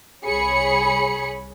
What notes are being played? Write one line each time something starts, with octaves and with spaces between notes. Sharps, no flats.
C2 G#4 C#5 B5 C#7